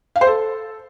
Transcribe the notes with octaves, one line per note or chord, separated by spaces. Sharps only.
F5
C5
A4